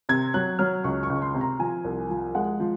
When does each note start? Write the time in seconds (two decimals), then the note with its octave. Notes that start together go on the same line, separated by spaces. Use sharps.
0.09 C3 G#6
0.34 F#3 F#6
0.59 F#3 F6
0.84 C#2 C#6
1.03 C#6
1.10 C#2
1.16 C#6
1.22 C6
1.34 C3
1.41 A#5
1.60 F3 G#5
1.85 C2
2.10 F3
2.35 G#3 F#5
2.60 F3